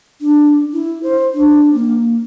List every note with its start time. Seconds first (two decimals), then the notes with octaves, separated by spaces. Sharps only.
0.21 D4
0.73 E4
1.03 C5
1.34 D4
1.74 A#3